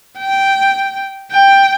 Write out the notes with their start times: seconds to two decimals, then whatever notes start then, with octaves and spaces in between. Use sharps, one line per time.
0.19 G5
1.32 G5